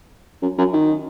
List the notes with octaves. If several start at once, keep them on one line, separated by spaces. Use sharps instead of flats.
F#2
F#2
D#3